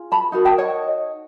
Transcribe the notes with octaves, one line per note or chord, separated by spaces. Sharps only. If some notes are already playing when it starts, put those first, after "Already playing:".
Already playing: F4 G#4
A5 B5
D#4 F#4 A#4
G5 A5
C#5 D#5